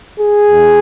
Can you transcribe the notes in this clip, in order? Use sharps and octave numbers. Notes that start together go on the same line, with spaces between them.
G#4
E2